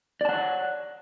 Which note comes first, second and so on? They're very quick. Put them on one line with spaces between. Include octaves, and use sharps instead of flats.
D5 A5 F#5 C#5